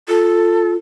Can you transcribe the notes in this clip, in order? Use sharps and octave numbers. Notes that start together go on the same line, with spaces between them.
F4 A4